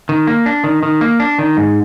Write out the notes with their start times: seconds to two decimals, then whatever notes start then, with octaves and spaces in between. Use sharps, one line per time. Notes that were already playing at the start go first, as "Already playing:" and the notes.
0.09 D#3
0.27 A#3
0.46 D4
0.64 D#3
0.83 D#3
1.01 A#3
1.20 D4
1.39 D#3
1.57 G#2